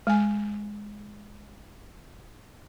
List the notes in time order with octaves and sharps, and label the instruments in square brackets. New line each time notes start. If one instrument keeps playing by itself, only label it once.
[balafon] G#3 G#5